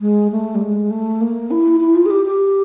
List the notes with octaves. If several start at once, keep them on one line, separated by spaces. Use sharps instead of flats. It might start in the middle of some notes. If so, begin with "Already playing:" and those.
G#3
A3
G3
G#3
A3
A#3
E4
E4
F4
G#4
G4
G4